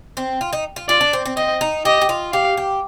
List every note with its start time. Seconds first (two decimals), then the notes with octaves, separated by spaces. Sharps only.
0.17 C4
0.41 F4
0.53 D#4
0.76 F4
0.89 F4 D5
1.01 D4
1.13 C4
1.26 C4
1.37 C4 D#5
1.61 D#4
1.85 G4 D#5
2.01 G4
2.09 F4
2.33 G4 F5
2.57 G4